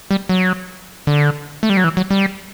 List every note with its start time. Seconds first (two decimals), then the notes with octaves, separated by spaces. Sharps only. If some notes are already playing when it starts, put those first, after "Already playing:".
0.11 G3
0.29 F#3
1.07 D3
1.63 A3
1.70 G3
1.77 F#3
1.84 E3
1.97 F#3
2.10 G3